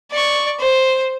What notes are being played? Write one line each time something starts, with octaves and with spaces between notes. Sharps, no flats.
D5 C#6
C5